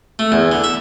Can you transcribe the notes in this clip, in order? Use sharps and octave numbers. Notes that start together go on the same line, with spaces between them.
A3
E2
D3
E5